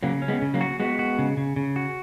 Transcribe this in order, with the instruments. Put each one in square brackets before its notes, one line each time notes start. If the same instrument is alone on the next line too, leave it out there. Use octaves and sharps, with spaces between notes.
[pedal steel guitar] C#3 [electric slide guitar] F#3 A#3
[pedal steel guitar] C#4
[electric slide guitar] G#3 B3
[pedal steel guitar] C#3
[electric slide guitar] F#3 A#3
[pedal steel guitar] F#4
[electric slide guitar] G#3 B3 [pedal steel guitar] F#4
[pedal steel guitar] F#4
C#3
C#3
C#3
F#4